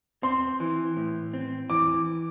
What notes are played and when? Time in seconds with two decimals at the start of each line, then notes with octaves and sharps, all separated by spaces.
0.23 C4 C6
0.60 E3
0.97 A2
1.33 C4
1.70 E3 D6